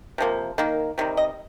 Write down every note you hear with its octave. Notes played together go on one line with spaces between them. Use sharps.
C3 F3 A#3
D#3 A#3
C3 D#3 G3
D#5